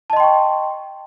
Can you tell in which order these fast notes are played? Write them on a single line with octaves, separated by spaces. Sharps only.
A5 D#5 C6 G5 C#6